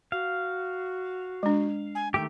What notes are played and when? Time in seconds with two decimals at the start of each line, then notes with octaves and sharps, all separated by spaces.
0.12 F#4 F5
1.43 G#3 D4
1.95 G#5
2.14 D#3 A3 G4 G5